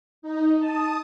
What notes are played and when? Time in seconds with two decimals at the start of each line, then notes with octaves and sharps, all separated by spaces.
0.22 D#4
0.58 A5 D#6